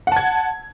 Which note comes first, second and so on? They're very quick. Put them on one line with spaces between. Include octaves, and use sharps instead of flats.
F#5 A5 G#6